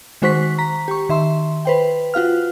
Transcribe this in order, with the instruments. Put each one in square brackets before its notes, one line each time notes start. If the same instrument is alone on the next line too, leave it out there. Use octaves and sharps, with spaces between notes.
[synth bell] D#3 G#3 F#4 C5 C#6 B6
A#5 B6
G4 C#6
D#3 E5 C6
B4 C5 G5
F4 F#4 F5 F6